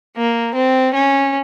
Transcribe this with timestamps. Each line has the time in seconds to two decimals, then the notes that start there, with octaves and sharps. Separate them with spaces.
0.16 A#3
0.54 C4
0.93 C#4